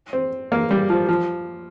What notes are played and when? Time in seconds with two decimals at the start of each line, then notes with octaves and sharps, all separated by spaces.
0.13 C4
0.52 A#3
0.71 G3
0.90 F3
1.09 F3